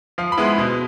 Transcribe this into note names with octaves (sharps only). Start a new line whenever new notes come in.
F3 F5
B5
G#3 B3 E4
C6
B2